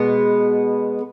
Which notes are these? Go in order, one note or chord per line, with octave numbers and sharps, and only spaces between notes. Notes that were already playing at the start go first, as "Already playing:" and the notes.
Already playing: B2 G#3 B3